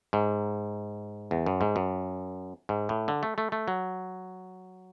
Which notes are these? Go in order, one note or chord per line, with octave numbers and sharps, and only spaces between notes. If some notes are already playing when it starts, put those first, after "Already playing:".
G#2
E2
F#2
G#2
F#2
G#2
A2
D3
A3
A3
A3
F#3